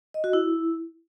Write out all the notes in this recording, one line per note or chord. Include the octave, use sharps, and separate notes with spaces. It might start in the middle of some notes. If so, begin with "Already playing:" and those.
D#5
F#4
E4